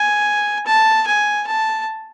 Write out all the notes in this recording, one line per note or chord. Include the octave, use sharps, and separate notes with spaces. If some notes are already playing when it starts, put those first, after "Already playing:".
Already playing: G#5
A5
G#5
A5